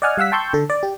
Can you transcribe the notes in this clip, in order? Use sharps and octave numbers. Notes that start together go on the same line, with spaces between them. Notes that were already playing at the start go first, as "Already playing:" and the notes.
D5 D#5 F#5 G#5 F6
G3 F5 F#5 E6 B6
G5 A5 C6 C#6 E6 G6
D3 A4
D5
G4